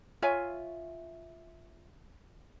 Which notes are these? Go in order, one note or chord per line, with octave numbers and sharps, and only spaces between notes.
F4 C#5 E5 G#5